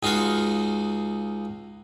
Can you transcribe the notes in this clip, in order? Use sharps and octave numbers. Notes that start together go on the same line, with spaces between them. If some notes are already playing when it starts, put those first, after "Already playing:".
C#2 D#4 F4 F#4 F5